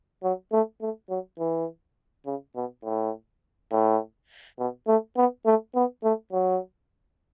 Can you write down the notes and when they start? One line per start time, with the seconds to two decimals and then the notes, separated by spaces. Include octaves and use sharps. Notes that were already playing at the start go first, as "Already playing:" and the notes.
0.23 F#3
0.52 A3
0.81 A3
1.10 F#3
1.39 E3
2.26 C#3
2.56 B2
2.84 A2
3.72 A2
4.59 B2
4.88 A3
5.17 B3
5.46 A3
5.75 B3
6.04 A3
6.33 F#3